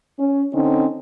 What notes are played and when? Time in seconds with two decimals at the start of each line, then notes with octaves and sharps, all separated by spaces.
0.19 C#4
0.53 D3 C4 C#4 D#4